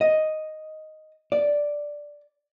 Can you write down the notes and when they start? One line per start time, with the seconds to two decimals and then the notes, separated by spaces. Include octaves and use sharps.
0.01 D#5
1.32 D5